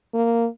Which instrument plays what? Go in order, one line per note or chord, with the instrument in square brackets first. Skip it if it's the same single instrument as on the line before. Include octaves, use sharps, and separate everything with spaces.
[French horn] A#3